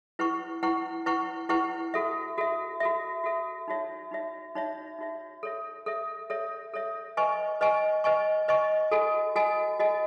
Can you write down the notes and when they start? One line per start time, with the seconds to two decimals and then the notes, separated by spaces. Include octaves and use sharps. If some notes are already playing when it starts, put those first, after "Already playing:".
0.19 E4 B4 F#5 C#6
0.63 E4 B4 F#5 C#6
1.06 E4 B4 F#5 C#6
1.49 E4 B4 F#5 C#6
1.94 F#4 A4 E5
2.38 F#4 A4 E5
2.80 F#4 A4 E5
3.24 F#4 A4 E5
3.68 D#4 F#4 C#5 E5
4.11 D#4 F#4 C#5 E5
4.55 D#4 F#4 C#5 E5
4.99 D#4 F#4 C#5 E5
5.43 A4 C#5 E5
5.86 A4 C#5 E5
6.30 A4 C#5 E5
6.74 A4 C#5 E5
7.17 B4 D#5 G#5 C#6
7.61 B4 D#5 G#5 C#6
8.04 B4 D#5 G#5 C#6
8.48 B4 D#5 G#5 C#6
8.91 F#4 A4 D#5 G#5
9.36 F#4 A4 D#5 G#5
9.79 F#4 A4 D#5 G#5